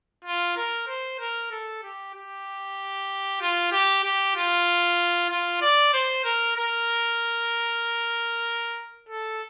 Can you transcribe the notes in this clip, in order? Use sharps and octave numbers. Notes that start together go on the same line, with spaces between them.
F4
A#4
C5
A#4
A4
G4
G4
F4
G4
G4
F4
F4
D5
C5
A#4
A#4
A4